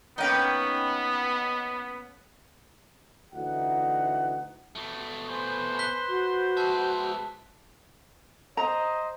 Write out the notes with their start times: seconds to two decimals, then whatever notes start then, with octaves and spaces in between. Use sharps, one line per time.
0.18 A#3 B3 C#4 D#4 B4 G5
3.33 D2 E3 D#4 F#5
4.75 B2 A3
5.29 B4 C5 G#5
5.79 F#6 B6 G7
6.09 F#4
6.57 G#3 E5 A5
8.57 C5 D#5 A#5